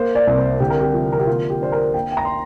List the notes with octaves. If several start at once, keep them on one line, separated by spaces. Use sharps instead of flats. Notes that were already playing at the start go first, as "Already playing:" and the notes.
Already playing: A#3 C5
D5
C2
C5
D3 G4
A#4
G4
F3
A#4
G4
A#3 F4
G4
D4 C5
A#4
A#3 G5
G5
A#5
C6